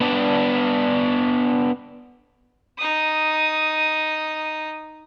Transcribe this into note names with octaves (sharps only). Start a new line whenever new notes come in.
B3 D4
D#4 D#6